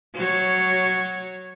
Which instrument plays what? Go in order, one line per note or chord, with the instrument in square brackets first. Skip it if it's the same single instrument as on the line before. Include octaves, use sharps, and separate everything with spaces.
[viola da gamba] F#3 C#5